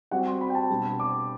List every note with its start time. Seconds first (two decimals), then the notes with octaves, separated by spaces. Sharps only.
0.11 G3 C4 F#4 F#5
0.26 C6
0.41 B5
0.50 G5
0.55 A5
0.70 B2 G3 B3 D4
1.00 D6